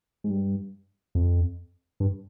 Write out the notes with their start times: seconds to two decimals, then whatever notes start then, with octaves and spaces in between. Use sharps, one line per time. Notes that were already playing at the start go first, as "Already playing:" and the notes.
0.24 G#2
0.30 G2
1.15 F2
2.00 G2